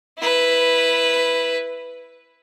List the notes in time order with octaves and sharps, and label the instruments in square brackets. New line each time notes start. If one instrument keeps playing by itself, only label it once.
[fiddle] E4 B4